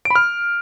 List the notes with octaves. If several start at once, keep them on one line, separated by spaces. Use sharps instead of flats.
D7
B5
F6